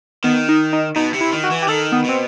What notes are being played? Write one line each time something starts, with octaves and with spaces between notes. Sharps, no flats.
D#3 B3
D#4
D#4
B2 D#4
C3
E4
D#3
F#4
E3
G4
D#3 A4
B3
B2 C4